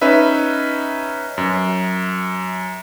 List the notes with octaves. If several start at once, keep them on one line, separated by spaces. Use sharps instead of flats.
C#4 D#4 B4 E5
F#2